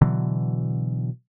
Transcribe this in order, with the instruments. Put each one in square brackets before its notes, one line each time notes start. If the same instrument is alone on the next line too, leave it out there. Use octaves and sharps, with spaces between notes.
[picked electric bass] B2 D3 E3 F#3